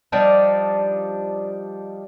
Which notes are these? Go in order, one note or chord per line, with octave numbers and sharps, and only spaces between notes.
F3 G3 D4 D#4